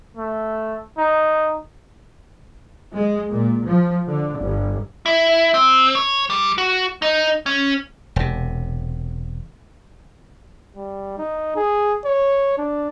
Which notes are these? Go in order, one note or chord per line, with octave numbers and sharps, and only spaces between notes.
A3
D#4
G#3
A#2
F3
D3
G1
E4
C4
C#5
G3
F#4
D#4
C#4
E1 C3
G3
D#4
G#4
C#5
D4